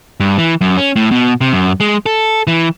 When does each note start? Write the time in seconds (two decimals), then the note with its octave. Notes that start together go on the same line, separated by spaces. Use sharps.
0.20 G2
0.38 E3
0.61 F#2
0.78 C#4
0.96 A2
1.11 B2
1.41 C3
1.53 F#2
1.80 G#3
2.06 A4
2.47 E3